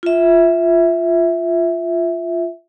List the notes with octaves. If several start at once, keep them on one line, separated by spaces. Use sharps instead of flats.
F4 E5